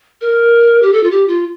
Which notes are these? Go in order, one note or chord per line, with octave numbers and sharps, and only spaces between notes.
A#4
G4
A4
F4
G4
F4